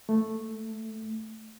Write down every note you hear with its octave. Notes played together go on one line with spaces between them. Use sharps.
A3